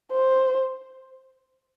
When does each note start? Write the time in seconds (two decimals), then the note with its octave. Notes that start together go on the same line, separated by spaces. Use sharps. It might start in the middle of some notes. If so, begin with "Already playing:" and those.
0.12 C5